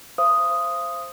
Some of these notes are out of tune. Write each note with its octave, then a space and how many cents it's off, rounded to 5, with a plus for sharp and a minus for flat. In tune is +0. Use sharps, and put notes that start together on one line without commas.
C5 +0 F5 -40 D#6 +0